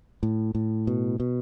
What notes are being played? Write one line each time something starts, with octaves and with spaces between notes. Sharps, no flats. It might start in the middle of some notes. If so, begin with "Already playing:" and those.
A2
A2
B2
B2